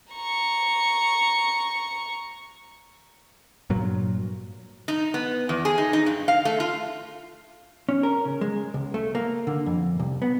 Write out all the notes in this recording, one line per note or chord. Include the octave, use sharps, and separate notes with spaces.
A#5 C#6
G2 A#2 F#3
D#4
B3
E2
G#4
D#4
D#4
G2
F5
A3
F4
C#4
A#4
C#3
G#3
C#2
A3
A#3
D3
F2
C2
B3